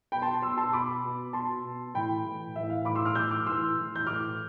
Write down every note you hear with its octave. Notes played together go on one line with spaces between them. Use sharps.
B2 G5 B5
A5 C6
B2 C6 E6
A5 C6
B2 B5 D6
B2
B2 A5 C6
B2
A2 E3 G5 B5
A2 E3
A2 E3 E5
F5
A2 E3 B5 D6
C6 E6
D6 F6
A2 E3 E6 G6
D6 F6
A2 E3 C6 E6
A2 E3
G6
A2 E3 D6 F6